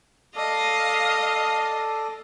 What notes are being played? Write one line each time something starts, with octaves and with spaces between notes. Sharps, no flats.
A4 D5 D#5 F5